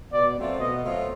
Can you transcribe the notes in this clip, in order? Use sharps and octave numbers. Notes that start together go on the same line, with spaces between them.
B2 D5
F#3 A3 C4 F4
B2 D#5
F#3 A3 C4 F4